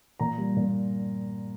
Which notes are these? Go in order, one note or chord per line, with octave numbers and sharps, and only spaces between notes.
A#2 A#5
G3
A#2